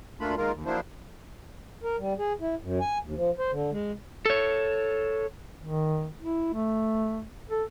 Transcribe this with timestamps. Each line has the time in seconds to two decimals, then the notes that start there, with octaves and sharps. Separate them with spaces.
0.20 D2 A3 A#3 D4 F4 B5
0.37 D#3 G#3 A#3 F4 A#4
0.54 D#2
0.66 F3 F#3 A#3 D4 E4 C5
1.83 A#4
1.99 G3
2.19 G#4
2.41 E4
2.61 F#2
2.81 G#5
3.03 D#2
3.15 F3
3.39 C5
3.51 D3
3.72 G#3
4.26 A4 C#5
5.62 D#3
6.20 E4
6.54 A3
7.49 A4